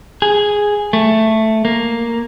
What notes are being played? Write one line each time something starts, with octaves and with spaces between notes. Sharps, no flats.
G#4
A3
A#3